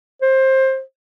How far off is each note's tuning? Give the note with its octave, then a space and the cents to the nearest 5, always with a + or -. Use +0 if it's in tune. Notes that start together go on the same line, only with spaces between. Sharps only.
C5 +20